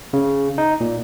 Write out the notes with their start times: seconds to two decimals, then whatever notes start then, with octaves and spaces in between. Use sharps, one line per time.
0.13 C#3
0.58 D#4
0.80 A#2